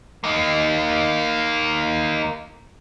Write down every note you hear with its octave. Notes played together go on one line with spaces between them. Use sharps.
A#3 D#4